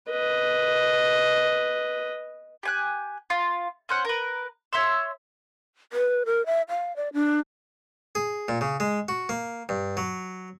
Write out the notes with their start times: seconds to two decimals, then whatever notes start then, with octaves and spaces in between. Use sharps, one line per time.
0.10 B4 D#5
2.63 G4 G#5 F#6
3.30 F4
3.89 C#4 C5 F#5
4.05 A#4 B4
4.73 C#5 E5 C6 E6
5.93 B4
6.26 A#4
6.46 E5
6.69 F5
6.96 D5
7.14 D4
8.15 G#4
8.48 A#2
8.61 C#3
8.80 G#3
9.08 F#4
9.29 A#3
9.69 G2
9.97 F#3